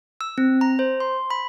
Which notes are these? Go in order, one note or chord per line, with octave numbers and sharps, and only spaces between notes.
E6
C4
A#5
C5
C6
B5